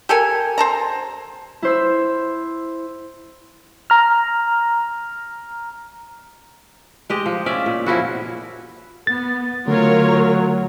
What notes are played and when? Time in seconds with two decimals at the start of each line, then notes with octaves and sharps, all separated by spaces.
0.09 G4 A4 A#4 G#5
0.58 C5 A5 A#5
1.62 E4 C5 E6
3.90 A#5 F6
7.10 G#3 G4 D#5
7.26 F3
7.46 C#4 D5 E5
7.66 A#2
7.86 F3 C#4 E4 F#4
9.07 B3 A6
9.67 D3 F#3 A3 F4 A#4 C#5